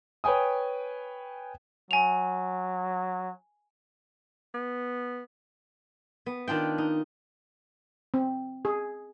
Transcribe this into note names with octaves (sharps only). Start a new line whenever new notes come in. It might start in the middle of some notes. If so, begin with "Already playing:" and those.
B4 C#5 G5 G#5 D#6
F#3 G#5 F7
B3
B3
D#3 D4 F4 G5
D#4
C4
G#4